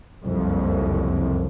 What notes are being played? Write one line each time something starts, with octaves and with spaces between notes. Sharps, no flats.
F#1 C2 F2